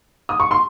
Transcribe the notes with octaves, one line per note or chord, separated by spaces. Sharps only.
D#6
C#6
C6